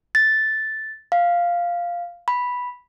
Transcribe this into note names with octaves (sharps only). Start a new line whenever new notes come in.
A6
F5
B5